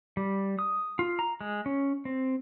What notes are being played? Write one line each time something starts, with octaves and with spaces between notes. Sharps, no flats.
G3
D#6
F4
A#5
G#3
C#4
C4